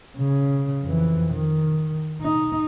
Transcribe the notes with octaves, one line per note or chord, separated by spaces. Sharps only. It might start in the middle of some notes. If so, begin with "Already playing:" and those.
C#3
F2 E3
D#3
D#4